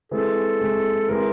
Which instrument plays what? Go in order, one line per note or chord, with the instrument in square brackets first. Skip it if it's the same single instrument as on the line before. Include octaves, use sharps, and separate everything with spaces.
[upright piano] E3 G#3 C4 [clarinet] A4
[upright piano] E3 G#3 C4
[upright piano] E3 G#3 C4 [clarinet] A#4